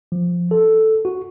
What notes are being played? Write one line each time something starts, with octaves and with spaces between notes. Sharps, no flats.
F3
A4
F#4